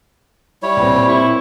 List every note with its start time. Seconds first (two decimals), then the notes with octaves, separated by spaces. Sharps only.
0.62 G3 E4 C#5
0.77 A#2 C4
1.08 E4 C#6